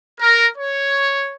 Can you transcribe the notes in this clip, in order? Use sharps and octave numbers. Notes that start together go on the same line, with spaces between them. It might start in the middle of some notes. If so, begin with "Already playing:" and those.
A#4
C#5